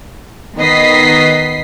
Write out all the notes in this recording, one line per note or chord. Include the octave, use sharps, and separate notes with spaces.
D#3 B3 D#5 B6 C7